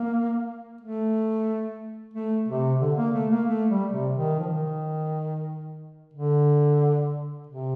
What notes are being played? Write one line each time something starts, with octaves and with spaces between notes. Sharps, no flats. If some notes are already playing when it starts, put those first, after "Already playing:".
Already playing: A#3
A3
A3
C3
D3
A#3
A3
A#3
A3
G3
C3
D#3
F3
D#3
D3
C3